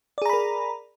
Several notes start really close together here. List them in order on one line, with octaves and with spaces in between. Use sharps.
D5 G#4 A#5 B5 A#4